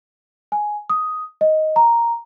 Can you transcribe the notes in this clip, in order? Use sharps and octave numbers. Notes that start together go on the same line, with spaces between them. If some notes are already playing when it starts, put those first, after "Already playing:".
G#5
D#6
D#5
A#5